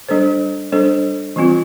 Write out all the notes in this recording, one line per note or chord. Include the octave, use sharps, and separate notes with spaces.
G3 D4 A4 C5
G3 D4 A4 C5
E3 G3 C4 F4